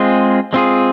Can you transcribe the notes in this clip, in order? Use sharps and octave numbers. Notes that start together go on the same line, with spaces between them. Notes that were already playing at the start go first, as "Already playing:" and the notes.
Already playing: G#3 C4 F4 G#4
G#3 C4 F4 G#4